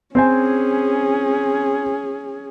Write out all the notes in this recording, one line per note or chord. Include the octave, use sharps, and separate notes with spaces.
C4 C#4 G#4 C5 G#5